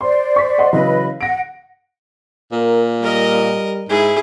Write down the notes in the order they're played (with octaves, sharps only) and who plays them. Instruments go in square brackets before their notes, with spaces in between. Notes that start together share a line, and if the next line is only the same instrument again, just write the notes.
[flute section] C5 D5 [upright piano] C6
[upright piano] C#6 B6
D#5 F#5 C6
[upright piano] C#3 E3 F#3 [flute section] B4 D#5 B5
[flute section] F#5 [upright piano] A#6 D7
[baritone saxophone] A#2 [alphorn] A#4
[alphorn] G3 [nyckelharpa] A#4 D#5
[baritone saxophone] G#2 [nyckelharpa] E4 G#4